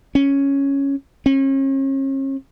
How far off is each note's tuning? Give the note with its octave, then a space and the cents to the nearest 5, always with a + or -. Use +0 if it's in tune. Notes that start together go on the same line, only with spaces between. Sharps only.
C#4 +0
C#4 -40